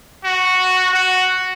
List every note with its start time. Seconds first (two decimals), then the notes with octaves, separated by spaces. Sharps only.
0.24 F#4
0.93 F#4